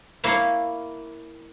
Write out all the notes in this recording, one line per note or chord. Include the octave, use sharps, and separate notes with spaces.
A#3 E4 C#5 E5 F5 A#5